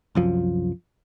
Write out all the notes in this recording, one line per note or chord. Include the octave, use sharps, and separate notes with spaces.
C2 F#2 F3